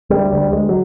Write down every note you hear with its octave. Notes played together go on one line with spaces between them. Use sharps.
D2 G3
D2 G3
D2 G#3
F#3